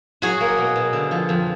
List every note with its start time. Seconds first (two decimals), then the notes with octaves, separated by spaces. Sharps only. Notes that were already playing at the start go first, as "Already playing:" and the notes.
0.22 F#3 F#4 G#4
0.40 A#3
0.57 B2
0.76 B2
0.93 D3
1.11 F3
1.29 F2